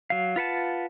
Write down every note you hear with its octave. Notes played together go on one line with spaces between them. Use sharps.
F#3 F5
F4 B4 F#5 A5